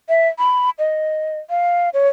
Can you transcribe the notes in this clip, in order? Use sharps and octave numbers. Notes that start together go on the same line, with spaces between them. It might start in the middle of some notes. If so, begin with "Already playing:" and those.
E5
B5
D#5
F5
C#5